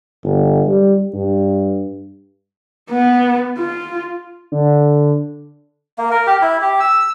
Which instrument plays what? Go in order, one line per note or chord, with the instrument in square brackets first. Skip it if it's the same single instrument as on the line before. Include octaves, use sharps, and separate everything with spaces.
[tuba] G1
G3
G2
[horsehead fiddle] B3
F4
[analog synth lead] D3
[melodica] A#3
A#4
G4
E4
G4
E6